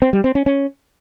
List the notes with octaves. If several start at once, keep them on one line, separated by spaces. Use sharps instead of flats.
C4
G3
C4
C#4
C#4